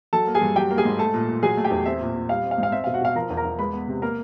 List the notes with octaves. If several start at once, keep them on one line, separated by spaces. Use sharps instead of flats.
F#3 A4 A5
A#3
G#4 G#5
G2
F#3 G4 G5
A#3
G#4 G#5
G#2
A3 A4 A5
A#2
A#2
F#3 G#4 G#5
A3
G4 G5
E2
C4 E5
A#2
A#2
G3 F5
C4
F5
G#2
F5
C4 E5
B2 F5
F#4 F#5
B2 F5
F3 A#4 A#5
E2
A#4 A#5
E2
G#3 B4 B5
B3
C3
A#3 A#4 A#5